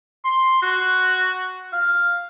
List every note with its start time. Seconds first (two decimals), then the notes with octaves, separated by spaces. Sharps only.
0.25 C6
0.62 F#4
1.73 F5